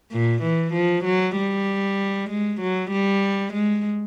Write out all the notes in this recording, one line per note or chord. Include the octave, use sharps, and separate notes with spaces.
A#2
E3
F3
F#3
G3
G#3
F#3
G3
G#3